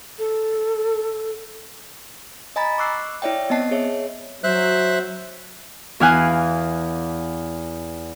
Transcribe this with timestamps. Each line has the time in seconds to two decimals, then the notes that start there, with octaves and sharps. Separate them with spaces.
0.19 A4
2.56 D#5 G#5 A#5 B5 A6
2.78 C#6 D6 E6 F#6 C7
3.22 E4 C#5 D5 E5 G5
3.50 B3 C4 D#5 A5 C7
3.71 G#4 C#5 E5
4.44 F#3 C5 E5 F#6
6.00 E2 E3 F5 G#5 F#6